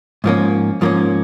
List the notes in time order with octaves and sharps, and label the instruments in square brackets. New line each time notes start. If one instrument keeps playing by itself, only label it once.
[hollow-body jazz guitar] G#2 F3 A#3 C#4
G#2 F3 A#3 C#4